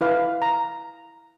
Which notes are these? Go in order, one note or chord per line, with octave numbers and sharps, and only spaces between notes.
E4 B4 F5
A#5